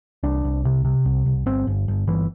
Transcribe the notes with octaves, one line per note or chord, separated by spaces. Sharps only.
C2 D4
C2
C3
C3
C2
C2
G1 C4
G1
G1
G1 E3